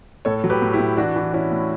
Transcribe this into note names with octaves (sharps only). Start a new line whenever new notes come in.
A2 A4 C#5
F#3
G4 B4
A2
E4 G4
A2
E3 D4 F#4
E3
E3 C#4 E4
A2